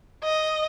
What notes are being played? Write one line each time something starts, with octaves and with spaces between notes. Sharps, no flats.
D#5